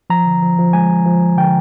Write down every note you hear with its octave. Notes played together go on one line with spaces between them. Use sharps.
F3 A#5
D3
F3
F3
G#3 G#5
G#3
F3
F3
D3 G5